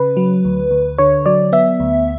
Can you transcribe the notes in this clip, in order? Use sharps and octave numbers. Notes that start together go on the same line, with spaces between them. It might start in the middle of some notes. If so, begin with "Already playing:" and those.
Already playing: C#3 B4
F#3
D2
D2
D3 C#5
F#3 D5
B3 E5
D2